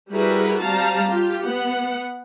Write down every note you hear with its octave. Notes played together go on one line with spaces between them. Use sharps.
G3 E4 F#4 G#4 A#4 B4
G3 C4 F5 A5 A#5
F4 G4
B3 F#5